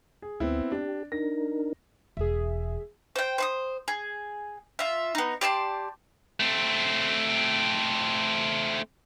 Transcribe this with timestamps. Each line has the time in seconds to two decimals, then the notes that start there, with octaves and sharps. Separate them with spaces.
0.22 G#4
0.40 D2 B3 C4 E4
0.72 D4 G4
1.12 D4 D#4 A#4 A#6
2.17 E1 E2 G#4 E5
3.16 C5 G5
3.38 C5 C6 D#6
3.88 G#4
4.79 F4 E5
5.15 B3 D#4
5.41 G4 D5 A5 C6
6.40 A3 C4